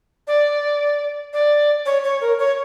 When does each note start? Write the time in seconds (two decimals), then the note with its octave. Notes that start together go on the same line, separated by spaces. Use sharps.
0.28 D5
1.33 D5
1.86 C#5
2.04 C#5
2.21 A#4
2.39 C#5